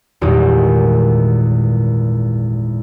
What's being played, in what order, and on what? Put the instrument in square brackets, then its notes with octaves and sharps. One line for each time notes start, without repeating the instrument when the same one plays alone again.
[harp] G#1 E2 A#2 G3 G#3